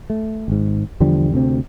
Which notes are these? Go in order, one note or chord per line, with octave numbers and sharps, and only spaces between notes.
A3
G#1 G#2
E2 D3 F3 G3
D2 C3 C4